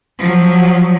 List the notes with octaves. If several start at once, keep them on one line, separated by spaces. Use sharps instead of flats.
F3 F#3